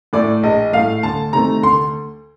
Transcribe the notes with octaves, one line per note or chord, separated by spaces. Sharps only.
A2 A3 D5
A#1 D#5
A2 A3 F5
D2 A5
C3 D#3 A3 A#5
D2 C6